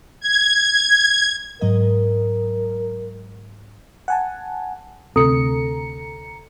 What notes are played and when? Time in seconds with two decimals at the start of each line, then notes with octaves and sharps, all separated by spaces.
0.20 G#6
1.61 G#2 F#3 A#4 D#5
4.08 F#5 G#5 A5
5.16 D2 C3 C4 A4 A#5 C#7